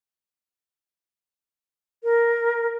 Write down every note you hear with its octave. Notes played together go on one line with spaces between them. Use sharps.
A#4